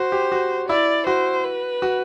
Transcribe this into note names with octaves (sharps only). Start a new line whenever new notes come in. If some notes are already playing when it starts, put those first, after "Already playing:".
Already playing: F#4 C5
G4
F#4
E4 D5
F#4 C5
B4
F#4